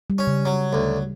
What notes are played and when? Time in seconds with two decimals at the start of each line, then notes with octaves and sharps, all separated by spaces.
0.10 G3
0.18 C#4
0.27 C#3
0.45 F#3
0.73 D2